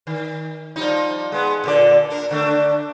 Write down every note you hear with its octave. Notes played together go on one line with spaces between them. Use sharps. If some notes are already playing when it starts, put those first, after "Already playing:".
D#3
F3 G3 D#4
G#3 B3
A#2 D3 D5
D4 A#4
D3 A3 D4